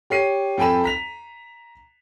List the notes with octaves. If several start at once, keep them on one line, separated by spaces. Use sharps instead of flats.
G4 C#5 C7 D#7
F2 A4 G5 G#5 B5 E7
A#5 B6 F7